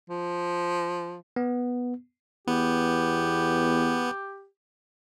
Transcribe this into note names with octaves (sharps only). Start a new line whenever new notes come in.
F3
B3
E2 B3 G4